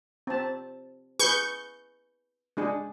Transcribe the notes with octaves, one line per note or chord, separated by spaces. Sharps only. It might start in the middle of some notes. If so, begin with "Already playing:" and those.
C4 A5
G#4 B4 C#6 G6
G#3 D4 G#4